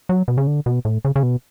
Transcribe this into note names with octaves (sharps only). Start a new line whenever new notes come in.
F#3
B2
C#3
D3
B2
A2
C#3
C#3
B2